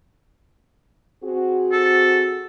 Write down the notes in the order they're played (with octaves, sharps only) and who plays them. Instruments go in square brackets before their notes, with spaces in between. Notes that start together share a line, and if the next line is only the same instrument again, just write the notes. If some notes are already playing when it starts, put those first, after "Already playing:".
[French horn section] C4 F#4 G#4
[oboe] A4